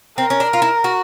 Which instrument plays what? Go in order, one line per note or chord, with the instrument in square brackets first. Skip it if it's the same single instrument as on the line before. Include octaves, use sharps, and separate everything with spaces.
[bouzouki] C4 [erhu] A#4
[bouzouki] C#4
D4
F4
E4
F#4